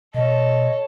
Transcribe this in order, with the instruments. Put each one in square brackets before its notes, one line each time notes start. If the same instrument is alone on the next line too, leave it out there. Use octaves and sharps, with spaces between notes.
[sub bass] B2 [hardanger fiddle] A4 C#5 [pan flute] D#5